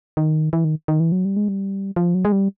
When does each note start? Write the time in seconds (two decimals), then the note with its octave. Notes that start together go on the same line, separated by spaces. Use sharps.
0.17 D#3
0.53 E3
0.64 D#3
0.88 D#3
1.00 E3
1.12 F#3
1.25 G3
1.37 G#3
1.48 G3
1.96 F3
2.15 F#3
2.25 G#3
2.32 G3